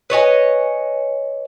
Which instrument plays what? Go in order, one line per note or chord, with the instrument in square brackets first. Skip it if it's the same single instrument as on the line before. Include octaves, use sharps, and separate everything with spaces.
[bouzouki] B4 C#5 D#5 G#5